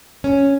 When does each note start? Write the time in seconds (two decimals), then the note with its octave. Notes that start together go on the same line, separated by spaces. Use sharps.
0.24 C#4